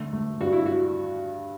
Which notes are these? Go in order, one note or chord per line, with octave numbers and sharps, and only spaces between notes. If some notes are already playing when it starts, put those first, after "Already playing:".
Already playing: D3 A3
A3
G2 F#4
E4
F#4